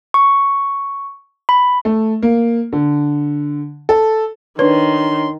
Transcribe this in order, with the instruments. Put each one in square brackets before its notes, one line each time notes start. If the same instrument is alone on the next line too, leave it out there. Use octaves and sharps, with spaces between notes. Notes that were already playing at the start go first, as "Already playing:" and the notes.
[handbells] C#6
B5
[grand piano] A3
A#3
D3
A4
[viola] D#3 [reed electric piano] D4 C#5 [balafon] B4 [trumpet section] C6